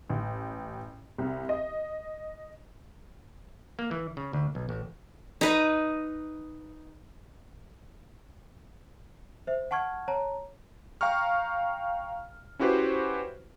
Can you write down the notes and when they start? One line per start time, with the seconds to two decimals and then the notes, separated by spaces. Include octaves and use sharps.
0.10 A1
1.18 C2
1.49 D#5
3.79 A#3
3.91 E3
4.17 C#3
4.33 D2
4.55 B1
4.69 A1
5.41 D#4 B4 D#5
9.47 C5 E5
9.71 F#5 A5 C#6 F6 G#6
10.08 C#5 A5 A#5
11.01 F5 G5 A#5 C#6 F6
12.59 C#4 E4 F#4 G4 B4 C5